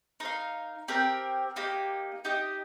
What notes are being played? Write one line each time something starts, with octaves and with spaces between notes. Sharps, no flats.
D#4 A#4 F5
C4 G4 A#4 G5
A#3 D#4 G4
D#4 G4 D#5